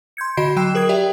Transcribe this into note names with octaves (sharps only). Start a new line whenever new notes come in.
C6 G6 G#6 C#7
D3 F#4 D#5 B5 C7 D7
F#3 G5 E6 F#6 E7
G#4 A#4 D#6 G#6
G4 D5 E5 G5